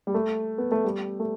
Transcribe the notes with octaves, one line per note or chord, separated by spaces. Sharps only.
G3
A3
B3
A3
G3
A3